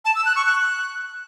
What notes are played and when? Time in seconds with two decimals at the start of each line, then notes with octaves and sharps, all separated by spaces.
0.05 A5
0.15 E6
0.25 F#6
0.36 C#6
0.46 F#6